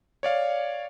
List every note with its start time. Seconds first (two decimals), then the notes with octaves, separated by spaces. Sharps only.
0.23 C#5 D5 F5